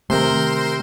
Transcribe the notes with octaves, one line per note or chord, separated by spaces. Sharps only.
C3 D#3 A3 A#4 C5 C6